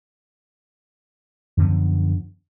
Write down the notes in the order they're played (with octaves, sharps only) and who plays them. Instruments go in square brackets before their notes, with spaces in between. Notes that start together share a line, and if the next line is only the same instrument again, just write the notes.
[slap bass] F#2 D3 F3 B3